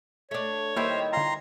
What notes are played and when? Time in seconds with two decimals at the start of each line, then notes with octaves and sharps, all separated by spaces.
0.31 A3 D4 C#5
0.76 D#3 G3 A#3 E4 C5
1.13 D3 F4 A#5 C6